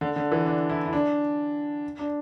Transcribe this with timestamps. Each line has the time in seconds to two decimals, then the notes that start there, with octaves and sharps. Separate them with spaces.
0.01 D3
0.16 D3
0.32 E3
0.46 D4
0.70 E4
0.86 E4
0.93 D4
1.99 D4